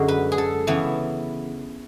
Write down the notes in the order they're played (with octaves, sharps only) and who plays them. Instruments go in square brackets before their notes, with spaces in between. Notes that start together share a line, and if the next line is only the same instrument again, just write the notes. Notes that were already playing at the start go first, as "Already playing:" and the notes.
Already playing: [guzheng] F#2 D3 G#3 F#4 G#4
B4
G#4
A4
C#3 E3 B3 E4